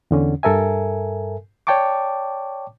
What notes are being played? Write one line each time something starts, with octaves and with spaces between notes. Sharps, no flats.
E2 D3 C#4
G2 A4 A#4 E5 G#5
C#5 D5 G5 A5 C#6 D6